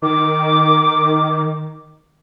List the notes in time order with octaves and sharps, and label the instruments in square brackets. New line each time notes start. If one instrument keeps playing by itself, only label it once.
[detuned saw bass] D#3 [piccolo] D6